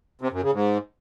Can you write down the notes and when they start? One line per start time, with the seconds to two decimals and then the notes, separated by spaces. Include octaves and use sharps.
0.21 C3
0.32 F#2
0.43 C#3
0.53 G#2